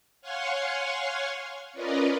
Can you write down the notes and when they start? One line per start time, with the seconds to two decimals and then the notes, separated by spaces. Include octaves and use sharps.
0.22 C#5 F5 F#5 G#5 C6 C#6
1.73 C#4 F4 A#4 B4 D5 D#5